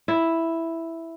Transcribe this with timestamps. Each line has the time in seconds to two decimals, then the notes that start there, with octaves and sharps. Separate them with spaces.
0.08 E4